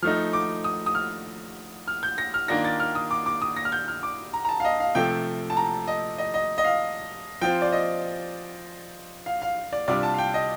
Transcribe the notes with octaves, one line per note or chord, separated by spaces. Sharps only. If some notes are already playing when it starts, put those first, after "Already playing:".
F3 A3 D#4 F6
D6
D#6
D#6
F6
F6
G6
A#6
F6
D#3 A#3 D4 F4 A#6
A6
F6
D#6
D6
D6
D#6
A#6
F6
G6
F6
D6
A#5
A#5
A5
F5
D#5
F5
C3 F3 A3 G5
A5
A#5
D#5
D#5
D#5
D#5
F5
F3 C4 F4 G5
D5
D#5
F5
F5
D5
C3 G3 D4 F4 D5
A5
F5
G5
D#5